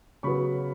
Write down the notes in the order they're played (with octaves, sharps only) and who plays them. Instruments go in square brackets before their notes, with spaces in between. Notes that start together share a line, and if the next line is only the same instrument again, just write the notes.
[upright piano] C#3 F#3 B3 B5 C#6